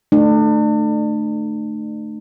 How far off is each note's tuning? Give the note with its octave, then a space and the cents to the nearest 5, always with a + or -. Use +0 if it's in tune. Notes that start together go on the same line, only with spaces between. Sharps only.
A3 +0 D4 +35